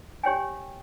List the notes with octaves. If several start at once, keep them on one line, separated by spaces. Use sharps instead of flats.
G4 C#5 G5 G#5